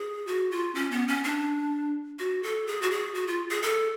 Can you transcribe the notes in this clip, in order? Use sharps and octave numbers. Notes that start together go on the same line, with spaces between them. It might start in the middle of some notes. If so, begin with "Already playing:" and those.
Already playing: G#4
F#4
F4
C#4
B3
C#4
D4
F#4
A4
G#4
F#4
G#4
F#4
F4
G#4
A4